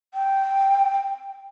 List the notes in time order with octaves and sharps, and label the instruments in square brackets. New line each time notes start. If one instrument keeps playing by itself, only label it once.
[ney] G5